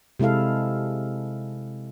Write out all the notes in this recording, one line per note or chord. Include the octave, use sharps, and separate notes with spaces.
C3 G#3 E4 A4 F5